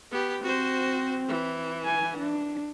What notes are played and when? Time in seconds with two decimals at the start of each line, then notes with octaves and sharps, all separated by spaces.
0.11 B3 G4
0.43 C4 F#4 C5
1.28 E3
1.85 G#5
2.19 D4